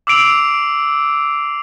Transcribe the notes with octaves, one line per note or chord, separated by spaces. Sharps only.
D6 E6 C7 D7 F7 F#7